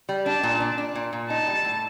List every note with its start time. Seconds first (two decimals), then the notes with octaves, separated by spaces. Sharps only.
0.09 G3
0.26 D4 A5
0.43 A#2
0.60 D4
0.78 D4
0.95 A#2
1.13 A#2
1.30 D#4 A5
1.47 G3
1.65 A2